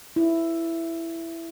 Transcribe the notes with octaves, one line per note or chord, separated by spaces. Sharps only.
E4